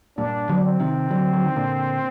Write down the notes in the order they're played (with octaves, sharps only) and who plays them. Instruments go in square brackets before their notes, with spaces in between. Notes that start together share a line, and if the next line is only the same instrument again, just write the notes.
[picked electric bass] G2 A#2 [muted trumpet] D4
[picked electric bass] D3 F#3
[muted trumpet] C4
[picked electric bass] C3 D#3
D3 F#3
F#3
D#3
A#2 D3